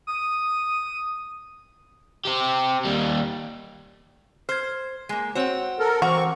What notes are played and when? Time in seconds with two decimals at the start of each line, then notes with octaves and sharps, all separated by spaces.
0.07 D#6
2.25 C4 G4
2.85 D#2 G3
4.49 C5 F6 G#6
5.09 G#3 A#3
5.35 C4 F#4 C5 C#5 F#5
5.79 A4 A#4
6.02 E3 C4 F#4 A#5 C#6